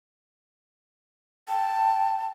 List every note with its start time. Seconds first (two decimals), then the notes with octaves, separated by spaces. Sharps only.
1.49 G5 A5